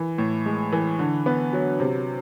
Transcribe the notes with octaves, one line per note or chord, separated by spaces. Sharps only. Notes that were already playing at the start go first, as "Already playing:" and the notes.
Already playing: E3
A2
G#3
E3
D3
B3
F#3
C3